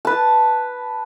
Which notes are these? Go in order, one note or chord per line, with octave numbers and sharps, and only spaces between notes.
B4 A5